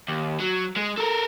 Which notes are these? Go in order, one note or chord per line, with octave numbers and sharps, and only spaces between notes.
D#2
F#3
G#3
A4 A#4